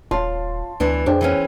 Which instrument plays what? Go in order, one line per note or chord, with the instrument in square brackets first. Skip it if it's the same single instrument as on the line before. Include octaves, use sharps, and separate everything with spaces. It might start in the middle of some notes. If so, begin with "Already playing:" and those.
[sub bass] D#1 [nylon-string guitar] F4 [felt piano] C#5 A5 C6
[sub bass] D2 [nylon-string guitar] E3 B3 D4
[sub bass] F2 [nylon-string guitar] D4 [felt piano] G#4 C5 G5
[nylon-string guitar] E3 B3 C#4